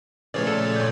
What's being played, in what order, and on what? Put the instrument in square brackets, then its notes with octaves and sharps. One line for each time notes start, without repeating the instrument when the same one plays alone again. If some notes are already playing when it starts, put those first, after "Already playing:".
[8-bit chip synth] A#2 C#5 D5 [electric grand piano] C#3 F3 A3 [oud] E3
[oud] A4
[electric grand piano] G1 G6